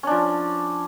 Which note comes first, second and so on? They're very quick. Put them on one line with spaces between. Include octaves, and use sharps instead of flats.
C#4 D4 F3